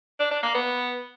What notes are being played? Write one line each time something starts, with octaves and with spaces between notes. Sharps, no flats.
D4
D4
A#3
B3